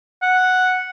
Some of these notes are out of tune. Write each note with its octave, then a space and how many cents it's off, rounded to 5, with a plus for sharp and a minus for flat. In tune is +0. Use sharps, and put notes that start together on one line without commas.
F#5 +0